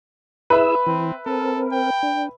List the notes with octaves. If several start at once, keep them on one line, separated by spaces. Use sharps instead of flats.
E4 G#4 B4 E5 B5 E6
E3 C4
C4 A4 A#4
G5
D4